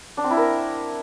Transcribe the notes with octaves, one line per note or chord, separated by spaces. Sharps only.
D4
C4
E4
A#4